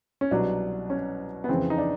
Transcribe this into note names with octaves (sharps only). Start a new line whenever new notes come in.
C#4
C2 B2 F#3 D4
C#4
B3
F2 C#3 E3 C4
D#4
D4